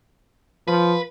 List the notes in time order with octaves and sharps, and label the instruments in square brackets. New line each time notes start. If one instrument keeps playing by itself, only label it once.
[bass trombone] F3 [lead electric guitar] B4